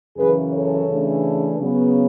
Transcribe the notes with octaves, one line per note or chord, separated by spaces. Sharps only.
F#2 C#3 E3 G#4 B4
A4 C#5
C#3 E3 A3 D4
C#3 F#3 B3